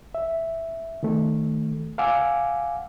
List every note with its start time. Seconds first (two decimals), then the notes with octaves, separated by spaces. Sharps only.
0.15 E5
1.03 D#3 A3
1.98 F5 F#5 G#5 D6 E6